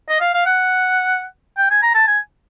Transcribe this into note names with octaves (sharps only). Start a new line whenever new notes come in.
D#5
F5
F5
F#5
G5
G#5
A#5
A5
G#5